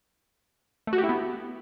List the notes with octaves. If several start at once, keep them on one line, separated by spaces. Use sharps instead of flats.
A3
F#4
G4
E4
B3